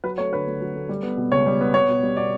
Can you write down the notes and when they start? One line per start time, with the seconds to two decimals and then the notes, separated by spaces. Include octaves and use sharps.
0.04 F#3 B4
0.18 A3 C#5
0.32 D3 B4
0.47 D2
0.61 F#3
0.76 A3
0.89 G3
1.03 B3
1.17 B2
1.31 C#2 C#5
1.46 G3
1.61 B3
1.74 B3 C#5
1.88 B2
2.03 G3
2.17 B2 D5